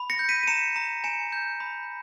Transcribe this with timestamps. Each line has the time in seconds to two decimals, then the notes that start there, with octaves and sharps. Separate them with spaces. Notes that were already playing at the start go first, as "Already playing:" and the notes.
Already playing: B5
0.10 A#6 C#7
0.19 G6
0.29 B6 D#7
0.43 D#7
0.47 A#5 C#7 E7
0.76 A#5
1.04 G#5 C#7 E7
1.32 G6
1.60 B5